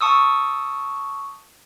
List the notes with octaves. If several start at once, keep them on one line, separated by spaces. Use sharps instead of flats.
A5 C#6 D#6 E6